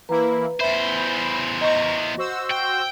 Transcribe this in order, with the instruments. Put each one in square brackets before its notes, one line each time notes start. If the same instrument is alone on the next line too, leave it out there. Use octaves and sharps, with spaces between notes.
[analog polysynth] E3 A#3 E4 [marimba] B4 A#5
[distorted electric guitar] E2 C5 [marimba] E5 [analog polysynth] B5
[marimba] D#5 [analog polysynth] A#5 C#6
[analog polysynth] F#4 C5 E6
[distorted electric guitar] G5